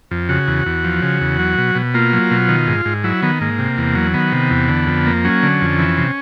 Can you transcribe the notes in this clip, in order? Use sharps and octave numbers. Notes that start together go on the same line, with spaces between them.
F2
C#3 F#4
E2
E2
F3
C#3
E2
F#3
B2
B2
A#3 F4
F#3
B2
D#3
G#2
G#2
F#3 E4
D#3 B3
G#2 A#3
C3
E2
F#3
D#3 B3
C3
E2
D3
F2
A#3
F#3 C#4
D3
F2
E3
C3